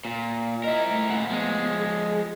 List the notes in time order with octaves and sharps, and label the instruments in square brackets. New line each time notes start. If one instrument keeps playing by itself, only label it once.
[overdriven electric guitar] A#2
[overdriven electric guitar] E4 A#4 [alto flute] D#5
[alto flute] A3
[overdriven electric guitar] A#2 F#5
[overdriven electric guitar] F3 G#3 [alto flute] B3
[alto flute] G#4